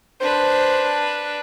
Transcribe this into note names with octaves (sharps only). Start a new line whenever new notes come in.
D4 B4 C5